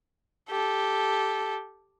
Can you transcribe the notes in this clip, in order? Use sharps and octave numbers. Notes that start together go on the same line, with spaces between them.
G4 A4